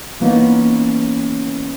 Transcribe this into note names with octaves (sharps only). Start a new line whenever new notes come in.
E3 A#3 B3 C#4 D#4